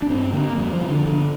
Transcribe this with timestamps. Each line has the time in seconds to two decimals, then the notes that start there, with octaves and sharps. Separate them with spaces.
0.02 D4
0.09 G2 C4
0.33 D3 A#3
0.57 F2 G3
0.73 F3
0.81 C3
0.89 D3
1.06 G2 D3